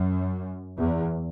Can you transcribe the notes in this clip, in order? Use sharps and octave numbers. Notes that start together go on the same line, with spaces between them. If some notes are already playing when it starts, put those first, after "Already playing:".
Already playing: F#2
E2